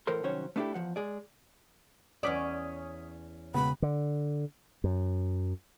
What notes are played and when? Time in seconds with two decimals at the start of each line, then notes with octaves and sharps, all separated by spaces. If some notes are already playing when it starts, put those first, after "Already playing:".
0.07 A2 E3 A4 A#4 C5 C6
0.23 C2 D#3 F#3 C#4 C5 C#5
0.56 A3 B3 D4 E4 G4 A4
0.74 E2 D#3 F3 F#5
0.96 G#3 G#4 D5
2.23 E2 C#4 D5 D#6 B6
3.54 E1 C#3 B3 B5
3.82 D3
4.84 F#2